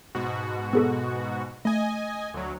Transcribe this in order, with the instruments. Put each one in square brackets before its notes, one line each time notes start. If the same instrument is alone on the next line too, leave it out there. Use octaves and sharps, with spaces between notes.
[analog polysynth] G#2 B2 F#4
[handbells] B3 G#4 A4
[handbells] A3 [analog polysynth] D#5 G#5
[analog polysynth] D2 F#3